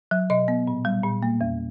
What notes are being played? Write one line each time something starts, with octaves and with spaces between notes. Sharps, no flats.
F#3
B2 D#5
B3
A#2
G3
A#2
A#3
E2